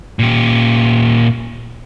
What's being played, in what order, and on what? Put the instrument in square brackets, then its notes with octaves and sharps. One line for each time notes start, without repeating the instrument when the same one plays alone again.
[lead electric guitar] A#2 G4